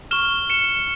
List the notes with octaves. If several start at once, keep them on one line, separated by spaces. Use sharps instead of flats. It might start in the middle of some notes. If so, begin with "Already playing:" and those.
C#6 F6 E7 G7
C#7 E7